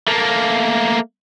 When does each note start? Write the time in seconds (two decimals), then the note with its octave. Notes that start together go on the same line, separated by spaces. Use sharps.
0.08 A3 A#3